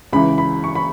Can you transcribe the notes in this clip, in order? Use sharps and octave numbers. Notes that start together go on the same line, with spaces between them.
C#2 C#3 E3 B5
B5
C#6
B5